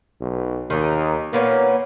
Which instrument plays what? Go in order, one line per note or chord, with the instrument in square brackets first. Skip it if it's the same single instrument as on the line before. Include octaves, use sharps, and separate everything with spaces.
[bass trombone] B1
[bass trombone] D#2 [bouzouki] D#3 D#4
[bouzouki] A#2 B3 C#4 [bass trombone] A#3